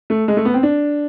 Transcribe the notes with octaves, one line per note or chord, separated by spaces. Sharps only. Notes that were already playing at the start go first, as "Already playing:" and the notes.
A3
G#3
A3
B3
C4
D4